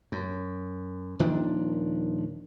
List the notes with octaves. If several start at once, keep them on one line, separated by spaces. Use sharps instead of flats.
F#2
D#1 D#3 F3 D4